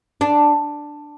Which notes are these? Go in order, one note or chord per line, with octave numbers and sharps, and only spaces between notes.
D4